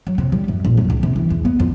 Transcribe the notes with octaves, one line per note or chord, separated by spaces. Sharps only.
F#3
C3
G3
F#2
A#1
F#2
C#2
C3
E3
E2
B3
F2